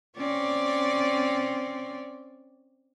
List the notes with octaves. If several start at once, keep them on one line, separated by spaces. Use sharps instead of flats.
C4 C#4 D5